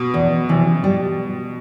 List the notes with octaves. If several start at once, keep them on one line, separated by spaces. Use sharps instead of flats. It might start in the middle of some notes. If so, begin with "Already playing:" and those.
Already playing: B2
E2
C3 E3
G3